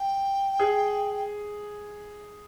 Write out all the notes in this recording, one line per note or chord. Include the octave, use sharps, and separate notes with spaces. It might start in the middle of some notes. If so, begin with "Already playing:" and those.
Already playing: G5
G#4